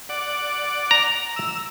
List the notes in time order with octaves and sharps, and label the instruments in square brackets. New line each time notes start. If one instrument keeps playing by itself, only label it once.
[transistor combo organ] D5 F#5
[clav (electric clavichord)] A#5
[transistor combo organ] E6